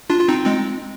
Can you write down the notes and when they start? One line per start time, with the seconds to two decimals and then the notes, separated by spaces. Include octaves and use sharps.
0.10 D4 F4
0.20 F4
0.28 C4 D#4
0.45 G#3 C4